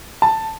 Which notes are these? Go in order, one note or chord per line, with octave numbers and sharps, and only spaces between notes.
A5